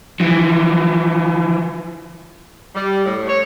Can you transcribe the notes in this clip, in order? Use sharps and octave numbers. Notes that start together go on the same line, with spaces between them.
E3 F3
G3
A2
C#5